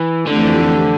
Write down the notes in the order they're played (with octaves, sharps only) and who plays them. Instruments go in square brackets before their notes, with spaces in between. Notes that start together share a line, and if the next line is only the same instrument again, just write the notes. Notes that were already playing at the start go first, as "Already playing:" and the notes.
Already playing: [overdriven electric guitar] E3
[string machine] F2 E3 A3 C4 G4 [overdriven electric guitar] D3